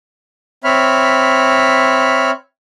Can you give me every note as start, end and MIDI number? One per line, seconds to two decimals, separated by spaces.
0.64 2.31 60
0.64 2.31 73
0.64 2.31 76
0.64 2.31 83
0.64 2.31 89